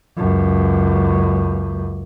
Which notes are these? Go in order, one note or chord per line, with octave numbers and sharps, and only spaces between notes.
C#2 F#2